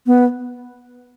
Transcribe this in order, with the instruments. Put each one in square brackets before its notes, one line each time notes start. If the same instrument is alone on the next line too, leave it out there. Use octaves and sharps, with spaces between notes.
[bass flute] B3